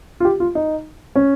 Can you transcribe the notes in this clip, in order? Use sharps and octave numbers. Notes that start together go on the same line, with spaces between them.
F4
G4
F4
D#4
C#4